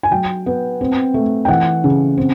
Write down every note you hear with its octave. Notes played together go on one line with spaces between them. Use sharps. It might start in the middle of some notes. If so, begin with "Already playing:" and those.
G#5
F#3 G5
B3
C4
A3
G5
E3 F#5
C#3
C4